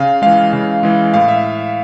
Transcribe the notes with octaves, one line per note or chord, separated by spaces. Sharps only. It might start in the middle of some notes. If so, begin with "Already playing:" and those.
Already playing: C#3 F5
E3 G#3 F5
C#3
E3 G#3
A2 F5
E5